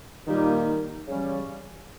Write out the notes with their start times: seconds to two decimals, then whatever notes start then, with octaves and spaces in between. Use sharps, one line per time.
0.27 A#2 D#3 G3 A#3 D#4 G4
1.06 C#3 E3 G3 C#4 G4